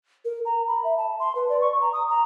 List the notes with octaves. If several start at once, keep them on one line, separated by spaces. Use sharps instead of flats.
A#4
A#5
B5
E5
A5
C6
B4
D5
C#6
A#5
D#6
A#5